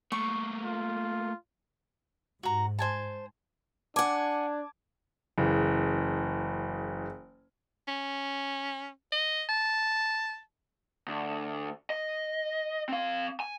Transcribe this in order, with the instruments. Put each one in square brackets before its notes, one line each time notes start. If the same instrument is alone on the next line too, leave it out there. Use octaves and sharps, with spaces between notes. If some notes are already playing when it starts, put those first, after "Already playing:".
[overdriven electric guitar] A3 A#3 [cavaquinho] C#6
[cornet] F4
[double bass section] G#2 [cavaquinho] F#4 A#5
[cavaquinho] C5 G#5 A5
[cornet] D4 [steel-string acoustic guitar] F#5 G#5 [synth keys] A5 D6 G#6
[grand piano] F#1 C#3 E3
[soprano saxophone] C#4
D#5
A5
[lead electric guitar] D2
D#5
C4 F5
G#5